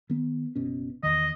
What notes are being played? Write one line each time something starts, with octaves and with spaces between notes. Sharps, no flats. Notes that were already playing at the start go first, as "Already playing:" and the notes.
D#3 B3
F#1 B2 C#4
E2 D#3 D#5